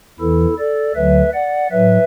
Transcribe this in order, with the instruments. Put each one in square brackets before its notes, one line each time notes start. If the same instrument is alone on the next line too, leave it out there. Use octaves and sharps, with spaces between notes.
[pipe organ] E2 E3 E4 A4
A4 D5
D2 D3 F#3 B4 E5
D5 F#5
A2 F#3 B4 E5